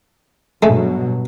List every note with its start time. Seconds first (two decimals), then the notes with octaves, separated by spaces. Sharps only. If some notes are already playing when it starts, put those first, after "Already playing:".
0.63 G2 B2 F#3 G#3 A3